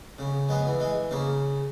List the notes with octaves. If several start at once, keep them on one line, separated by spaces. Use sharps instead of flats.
C#3
G#3 B3
E3
G#3
C#3 A#3